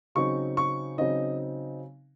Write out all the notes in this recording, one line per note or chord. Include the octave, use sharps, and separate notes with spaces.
C#3 F#3 C4 D#4 C#6
C#6
C#3 F#3 C4 D#4 D#5